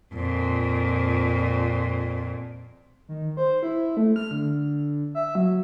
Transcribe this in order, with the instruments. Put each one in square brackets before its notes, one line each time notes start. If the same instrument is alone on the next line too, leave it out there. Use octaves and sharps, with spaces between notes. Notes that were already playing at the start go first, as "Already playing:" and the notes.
[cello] F2 A#2
[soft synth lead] D#3
C5
E4
A3
F6
D3
E5
F#3